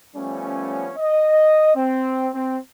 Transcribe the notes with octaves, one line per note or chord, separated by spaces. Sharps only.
F3 G3 A3 B3 C#4
D#5
C4
C4